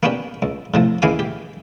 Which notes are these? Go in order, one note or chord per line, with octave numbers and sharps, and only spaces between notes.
A#3 B3 C#4 D4 G4
C#2
A2 C3 F3
D#2 C#3 E3 F5 G#5 D6
G4